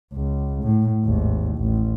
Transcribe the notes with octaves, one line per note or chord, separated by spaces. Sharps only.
C#2
A2
G#1 D#2
A1